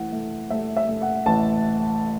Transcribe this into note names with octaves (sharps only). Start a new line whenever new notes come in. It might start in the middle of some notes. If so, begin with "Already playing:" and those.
Already playing: E3 A3 F#5
A3
A3 E5
E5
A3
F#5
A1 A5